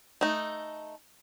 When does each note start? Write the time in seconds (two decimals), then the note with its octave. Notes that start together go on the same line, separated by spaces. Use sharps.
0.21 A3 D#4